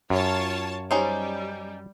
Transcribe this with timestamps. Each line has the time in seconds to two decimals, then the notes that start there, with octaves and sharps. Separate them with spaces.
0.10 F#2 F4 C#5 A5
0.91 G3 C#4 D#4 C5